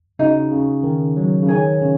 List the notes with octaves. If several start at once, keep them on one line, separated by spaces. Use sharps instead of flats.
C#3 D#4 F#4
C#3
D#3
F#3
C#3
D#3 G#4 C#5 G#5
C#3